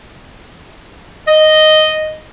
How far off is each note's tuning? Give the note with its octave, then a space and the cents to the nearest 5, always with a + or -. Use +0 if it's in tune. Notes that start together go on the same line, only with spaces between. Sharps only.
D#5 -5